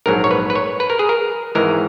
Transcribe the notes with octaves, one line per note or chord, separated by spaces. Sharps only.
A#1 G#2 F#3 A#4
C#5
B4
B4
C#5
B4
A#4
G#4
A#4
G#1 G#2 E3 G#3 A#4